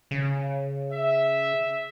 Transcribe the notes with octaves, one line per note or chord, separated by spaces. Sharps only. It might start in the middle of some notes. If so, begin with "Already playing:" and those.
C#3
E5